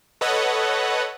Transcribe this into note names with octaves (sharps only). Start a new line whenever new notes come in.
A4 B4 C#5 D#5 F#5